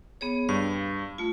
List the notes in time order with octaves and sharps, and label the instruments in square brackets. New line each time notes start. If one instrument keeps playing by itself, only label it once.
[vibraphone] B3 G#4 C#5
[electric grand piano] G2 [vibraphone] F5
[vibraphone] A3 F4